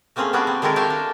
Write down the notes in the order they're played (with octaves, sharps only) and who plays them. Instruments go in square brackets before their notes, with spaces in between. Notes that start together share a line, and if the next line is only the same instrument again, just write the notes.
[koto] A3 A#3 C4 C#4 G#4
G3 B3 C#4 D4 F#4 G#4
C4
D#3 G#3 E4 A4 A#4
G4 C#5 E5 F5 G5 A5
D4